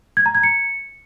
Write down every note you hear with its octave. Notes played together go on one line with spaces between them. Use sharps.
G#6
A#5
G#6
C#7